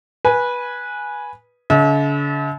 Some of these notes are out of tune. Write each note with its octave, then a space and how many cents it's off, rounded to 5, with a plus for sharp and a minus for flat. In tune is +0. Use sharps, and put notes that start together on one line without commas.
B4 -15 G#5 +0
D3 -45 E5 -45